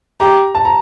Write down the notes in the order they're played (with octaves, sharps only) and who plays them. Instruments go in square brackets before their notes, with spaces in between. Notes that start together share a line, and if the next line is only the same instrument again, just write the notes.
[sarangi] G4 [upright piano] A#5
[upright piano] A5
A#5